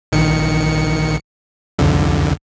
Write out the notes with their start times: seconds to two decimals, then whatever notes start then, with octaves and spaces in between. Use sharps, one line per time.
0.12 A#1 D#3 C#7
1.79 C2 F2 D3